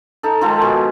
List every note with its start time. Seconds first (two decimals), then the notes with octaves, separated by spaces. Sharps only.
0.23 D#4 A4
0.41 D#3 F3 G#3 A4
0.62 B2 G#3